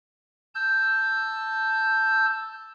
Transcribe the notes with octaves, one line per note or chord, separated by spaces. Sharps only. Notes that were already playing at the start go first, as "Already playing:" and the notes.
A5 E6 G6